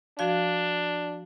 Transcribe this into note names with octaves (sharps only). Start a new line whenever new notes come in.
F3 D4 F#4 F5